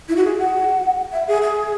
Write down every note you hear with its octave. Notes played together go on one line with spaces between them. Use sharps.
E4
F#4
G#4
F#5
E5
G#4
G#4